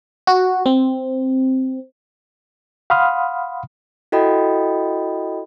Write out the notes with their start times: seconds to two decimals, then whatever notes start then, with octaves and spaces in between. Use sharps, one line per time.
0.27 F#4
0.66 C4
2.90 F5 F#5 B5 C6 D#6 F6
4.12 E4 F#4 A4 D#5 G5 B5